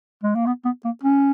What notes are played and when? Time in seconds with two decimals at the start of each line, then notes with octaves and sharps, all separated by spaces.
0.23 G#3
0.35 A#3
0.46 B3
0.65 B3
0.85 A#3
1.03 C#4